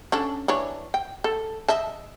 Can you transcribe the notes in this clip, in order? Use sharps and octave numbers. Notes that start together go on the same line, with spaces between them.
C#4 D4 A4
E3 D4 C#5
G5
A4
D#5 E5 A5